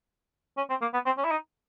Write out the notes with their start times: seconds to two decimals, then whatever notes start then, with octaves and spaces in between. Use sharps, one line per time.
0.57 C#4
0.70 C4
0.82 A#3
0.93 B3
1.06 C4
1.18 C#4
1.25 E4
1.31 D#4